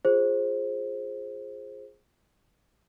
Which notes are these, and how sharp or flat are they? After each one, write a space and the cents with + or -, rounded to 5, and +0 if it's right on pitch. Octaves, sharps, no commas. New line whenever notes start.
F4 +10 G#4 +0 C5 +15